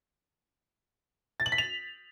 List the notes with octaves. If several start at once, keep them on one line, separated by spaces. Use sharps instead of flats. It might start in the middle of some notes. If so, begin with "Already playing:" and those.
A6
F#7
B6
F7